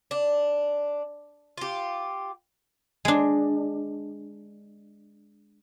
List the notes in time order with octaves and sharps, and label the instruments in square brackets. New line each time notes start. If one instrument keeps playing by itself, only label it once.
[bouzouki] D4
F4 G4
[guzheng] G#3 D4